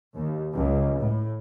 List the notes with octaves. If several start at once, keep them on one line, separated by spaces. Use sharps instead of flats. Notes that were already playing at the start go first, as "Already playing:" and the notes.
D#2
C#2
A2